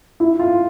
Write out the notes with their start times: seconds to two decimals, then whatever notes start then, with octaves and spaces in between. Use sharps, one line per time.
0.20 E4
0.39 F4